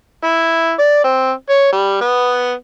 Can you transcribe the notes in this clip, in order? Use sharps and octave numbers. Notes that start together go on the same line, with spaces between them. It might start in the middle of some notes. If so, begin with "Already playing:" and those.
E4
D5
C4
C#5
G3
B3